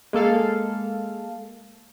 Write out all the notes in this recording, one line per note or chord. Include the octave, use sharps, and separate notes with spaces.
G#3 A#3 A4 F5